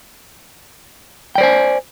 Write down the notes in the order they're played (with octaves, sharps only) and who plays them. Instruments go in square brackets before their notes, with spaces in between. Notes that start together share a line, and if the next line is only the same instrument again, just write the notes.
[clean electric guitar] G5
D5
C5
G#5